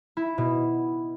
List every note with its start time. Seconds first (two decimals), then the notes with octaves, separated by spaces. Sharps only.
0.17 E4
0.38 B2